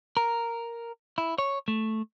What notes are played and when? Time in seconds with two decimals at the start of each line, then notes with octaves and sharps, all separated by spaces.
0.17 A#4
1.18 E4
1.38 C#5
1.68 A3